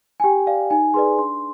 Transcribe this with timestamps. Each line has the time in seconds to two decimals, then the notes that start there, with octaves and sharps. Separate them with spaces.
0.20 G#5
0.24 G4 G5
0.47 D5 F5
0.70 D#4 G#5
0.94 G#4 B4 D5 C6
1.18 D4 C6